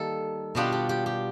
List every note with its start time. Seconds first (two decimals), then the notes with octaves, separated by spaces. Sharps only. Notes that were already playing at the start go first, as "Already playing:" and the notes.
Already playing: D#3 G3 A#3 A4
0.55 B2 G3 B3 D4 F4 G4
0.72 G4
0.89 G4
1.06 G4